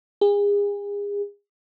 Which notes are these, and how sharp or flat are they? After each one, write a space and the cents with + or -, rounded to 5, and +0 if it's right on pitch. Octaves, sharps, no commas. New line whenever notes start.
G#4 -35